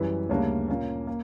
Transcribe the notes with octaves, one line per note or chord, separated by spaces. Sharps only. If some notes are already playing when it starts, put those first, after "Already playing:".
Already playing: F#2 E3 G3 B4
D2 C#3 G3 A#3 D4 C#5
A#2 A#3 C#4
A#3